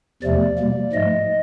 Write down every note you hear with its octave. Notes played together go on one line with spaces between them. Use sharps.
E2 C3 F3 A3 D5
B2 G3 A#3
G#2 F3 A3 D#5